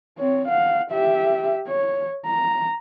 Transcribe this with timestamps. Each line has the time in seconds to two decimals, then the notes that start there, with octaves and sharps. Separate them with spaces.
0.19 C4 C#5
0.48 F5 F#5
0.91 G4 E5
1.68 C#5
2.26 A#5